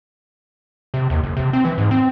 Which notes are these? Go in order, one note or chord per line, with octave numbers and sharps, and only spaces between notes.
C3
D#2
F#1
C3
C4
E3
G#2
C4